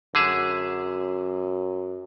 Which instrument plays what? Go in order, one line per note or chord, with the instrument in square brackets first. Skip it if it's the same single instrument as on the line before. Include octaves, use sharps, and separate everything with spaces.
[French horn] F#2 [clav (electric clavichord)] D3 G#4 E5